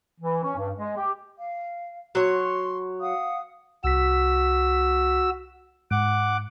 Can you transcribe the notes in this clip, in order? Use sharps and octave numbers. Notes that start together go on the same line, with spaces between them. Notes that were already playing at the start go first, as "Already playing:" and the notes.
E3
C#4
G2
G#3
G4
F5
F#3 C#5 C6
F5 F#5 D#6
C2 F#4 E6 B6
G#2 F#5 D6